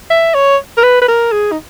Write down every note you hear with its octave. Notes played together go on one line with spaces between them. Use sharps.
E5
C#5
A#4
B4
B4
A#4
G#4
D#4